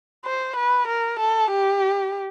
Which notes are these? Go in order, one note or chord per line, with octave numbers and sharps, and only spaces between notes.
C5
B4
A#4
A4
G4